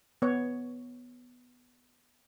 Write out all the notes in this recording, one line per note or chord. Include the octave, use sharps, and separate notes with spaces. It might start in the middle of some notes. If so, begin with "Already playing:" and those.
B3 C#5